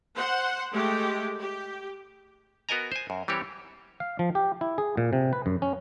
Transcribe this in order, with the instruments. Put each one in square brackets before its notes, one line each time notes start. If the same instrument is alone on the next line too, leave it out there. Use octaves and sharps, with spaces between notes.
[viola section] C5 F#5
G#3 A3 G4
G4
[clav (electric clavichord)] B3 F#4 A#4 D#5 G#5 A#5
C5 G#5
F#2
E3 G3 C4 G4 C#5
F5
F3
G4
E4
G#4
A#2
C3
B4
F#2
C#4